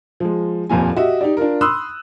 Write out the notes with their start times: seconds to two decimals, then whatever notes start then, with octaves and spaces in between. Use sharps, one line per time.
0.20 F3 G#3
0.70 D#1 F2 A#2 G#5
0.96 F#4 G4 D#5 E5
1.21 D#4 G4 D5
1.37 D4 F4 A#4
1.61 B5 C6 D#6 E6 F#6